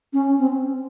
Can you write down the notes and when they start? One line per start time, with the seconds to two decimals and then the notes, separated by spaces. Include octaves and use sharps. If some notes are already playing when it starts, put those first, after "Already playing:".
0.13 C#4
0.38 C4